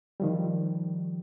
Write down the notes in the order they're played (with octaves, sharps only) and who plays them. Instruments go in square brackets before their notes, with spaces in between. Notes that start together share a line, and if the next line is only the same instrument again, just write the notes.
[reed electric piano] D#3 F3 G3